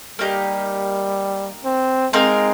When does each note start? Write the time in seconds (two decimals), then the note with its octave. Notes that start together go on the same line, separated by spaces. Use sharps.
0.19 G3 A#3 D#4 G4
1.65 C4
2.13 G#3 C4 D#4 A#4 F5